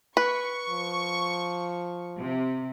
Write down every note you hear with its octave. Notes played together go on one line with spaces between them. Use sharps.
B4 C#6
F3
C3